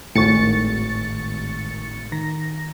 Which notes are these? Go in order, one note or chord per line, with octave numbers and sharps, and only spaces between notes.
G#1 C#2 A2 C#3 C#6 A6 C#7
D#3 A#6